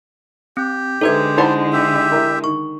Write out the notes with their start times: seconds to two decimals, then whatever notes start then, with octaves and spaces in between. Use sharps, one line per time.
0.57 C4 G4
1.01 D3 G#3 D#4 A4 B4 C5 E5 G#6
1.38 D#4 E4 C5 F#5 A5 B5
1.73 G4 E5
2.12 E4 A#4
2.44 D#3 C#6